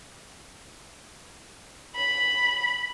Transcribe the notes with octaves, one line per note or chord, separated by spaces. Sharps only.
B5